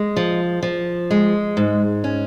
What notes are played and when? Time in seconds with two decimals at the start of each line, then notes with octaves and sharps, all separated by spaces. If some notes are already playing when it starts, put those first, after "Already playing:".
Already playing: G#3
0.16 F3
0.63 F3
1.11 G#3
1.57 G#2
2.04 C#4